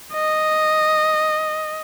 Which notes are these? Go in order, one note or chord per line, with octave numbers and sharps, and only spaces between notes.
D#5